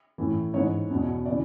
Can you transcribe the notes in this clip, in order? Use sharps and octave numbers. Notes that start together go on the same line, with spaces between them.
A2 E3
G#2 E3 C#5
E2 B2
C#3 E3 D5